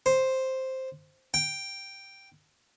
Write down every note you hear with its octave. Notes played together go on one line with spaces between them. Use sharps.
C5
G5